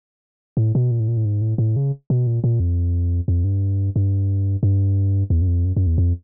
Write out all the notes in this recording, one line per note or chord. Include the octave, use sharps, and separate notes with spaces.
A2
B2
A#2
A2
A#2
A2
G#2
A2
A2
C#3
B2
A#2
A#2
F2
F2
G2
G2
G2
E2
F#2
F2
F#2
F#2
E2
F2